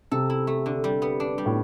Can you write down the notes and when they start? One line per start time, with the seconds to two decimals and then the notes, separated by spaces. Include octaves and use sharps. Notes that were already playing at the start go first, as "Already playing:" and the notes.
0.12 C3 A4
0.30 E4
0.47 A3
0.66 D3
0.84 G3
1.02 B3
1.20 D4
1.38 G3
1.46 A2